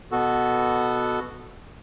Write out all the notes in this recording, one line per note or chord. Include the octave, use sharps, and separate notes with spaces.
B2 B3 F#4 A4